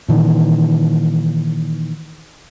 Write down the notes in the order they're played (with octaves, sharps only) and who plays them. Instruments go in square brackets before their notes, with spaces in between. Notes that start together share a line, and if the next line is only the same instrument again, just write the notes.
[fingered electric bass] A#2 D#3 E3